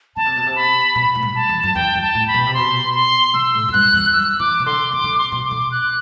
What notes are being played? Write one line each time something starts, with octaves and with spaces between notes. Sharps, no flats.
D3 A5
C3
B2
C3
B5
B2 B5
A2
G2
A5
E2
F#2
E2 G5
F#2
A5
A2
B5
B2
C3
B2 C6
C6
C3 E6
A2
F#2
G2 F#6
E2
F#2 E6
E3 D6
C3
D3 C6
C3 D6
D3
C3
C6
B2
D6
D3
F#6